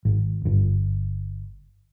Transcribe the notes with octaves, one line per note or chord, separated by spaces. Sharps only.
G#1
G1